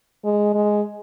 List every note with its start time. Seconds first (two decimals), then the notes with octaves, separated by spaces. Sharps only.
0.24 G#3
0.54 G#3